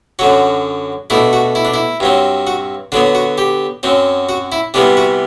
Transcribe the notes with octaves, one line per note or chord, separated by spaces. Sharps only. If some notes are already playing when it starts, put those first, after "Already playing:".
F#2 D3 F#3 F#4
B2 A3 D4 E4
F#4
E4
D4
E4
G2 F#3 C4
F#4
D3 F#3 B3 D4
F#4
G4
F#2 F#3 C4
F#4
E4
C3 E3 G3 B3 D4
F#4